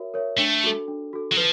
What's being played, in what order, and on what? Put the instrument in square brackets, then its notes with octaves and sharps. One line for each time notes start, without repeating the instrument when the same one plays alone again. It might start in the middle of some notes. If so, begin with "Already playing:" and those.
Already playing: [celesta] F#4 A#4 C#5 E5
A#4 C#5 E5
[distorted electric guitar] A3 [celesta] D4
[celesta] F#4 A4
D4
F#4 A4
[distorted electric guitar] F#3
[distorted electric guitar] F3 [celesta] B4